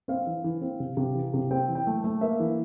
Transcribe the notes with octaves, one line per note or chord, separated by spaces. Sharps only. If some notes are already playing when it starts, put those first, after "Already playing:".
C4 F5
E3
E3
C4
C3
C3
E3
C3
C4 G5
E3
G5
A3
A3
A#3 E5
E3